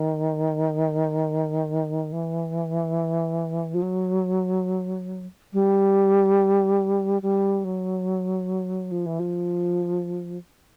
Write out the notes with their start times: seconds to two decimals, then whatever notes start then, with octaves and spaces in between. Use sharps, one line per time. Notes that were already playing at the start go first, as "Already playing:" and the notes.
Already playing: D#3
2.12 E3
3.74 F3
3.82 F#3
5.53 G3
7.22 G3
7.64 F#3
8.91 F3
9.06 E3
9.20 F3